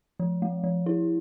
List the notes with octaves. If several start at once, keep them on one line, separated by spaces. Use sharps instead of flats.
F3
A3
F3
E4